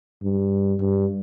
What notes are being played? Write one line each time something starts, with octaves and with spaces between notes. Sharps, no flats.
G2
G2